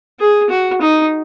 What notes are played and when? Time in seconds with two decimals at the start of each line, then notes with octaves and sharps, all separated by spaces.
0.20 G#4
0.50 F#4
0.81 D#4